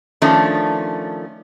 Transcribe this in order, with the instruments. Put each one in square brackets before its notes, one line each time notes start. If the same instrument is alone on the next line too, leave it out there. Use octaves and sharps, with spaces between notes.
[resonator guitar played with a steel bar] D#3 F3 A3 C#4 D4